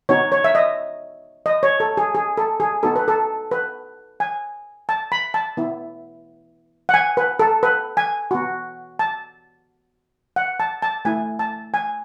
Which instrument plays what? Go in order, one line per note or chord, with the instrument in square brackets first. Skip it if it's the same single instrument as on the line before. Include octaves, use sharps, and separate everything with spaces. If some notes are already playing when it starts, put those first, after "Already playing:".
[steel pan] B3 D#4 F#4 C#5
C#5
E5
D#5
D#5
C#5
A4
G#4
G#4
A4
G#4
B3 D#4 F#4 A4
B4
A4
B4
G#5
A5
B5
A5
B3 E4
F#5
G#5
B4
A4
B4
G#5
B3 F#4
A5
F#5
A5
A5
A3 E4 G#5
A5
G#5